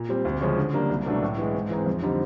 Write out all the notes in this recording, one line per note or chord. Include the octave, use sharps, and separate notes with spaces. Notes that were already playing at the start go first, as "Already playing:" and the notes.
Already playing: A#2
G3 C4
D2
C#3 F3 G#3 C#4
D3
G3 A#3 D4
C2
B2 F#3 A3 D4
A2
E3 G#3
G#2
E3 G#3 C4 D#4
F2
D3 G3 C4 D#4